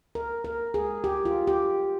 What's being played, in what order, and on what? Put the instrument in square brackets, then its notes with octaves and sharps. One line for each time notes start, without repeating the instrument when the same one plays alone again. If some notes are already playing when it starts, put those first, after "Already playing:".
[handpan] A#4
A#4
G#4
G4
F4
G4